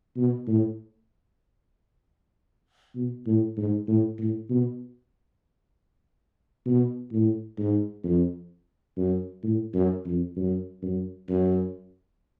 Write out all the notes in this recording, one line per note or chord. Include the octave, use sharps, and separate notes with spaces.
B2
A2
B2
A2
G#2
A2
A2
B2
B2
A2
G#2
F2
F#2
A2
F#2
F2
F#2
F#2
F#2